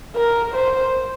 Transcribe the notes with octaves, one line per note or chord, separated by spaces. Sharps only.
A#4
C5